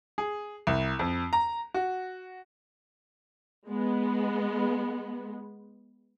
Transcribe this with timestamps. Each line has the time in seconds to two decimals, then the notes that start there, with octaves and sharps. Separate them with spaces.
0.18 G#4
0.67 C2
0.99 F2
1.33 A#5
1.74 F#4
3.67 G#3 B3